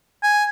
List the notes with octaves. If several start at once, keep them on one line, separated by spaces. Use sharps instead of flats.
G#5